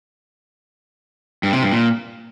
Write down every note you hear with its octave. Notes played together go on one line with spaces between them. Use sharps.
G2
C3
G2
A#2